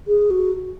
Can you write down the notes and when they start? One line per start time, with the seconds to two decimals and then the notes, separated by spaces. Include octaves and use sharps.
0.07 G#4
0.30 F#4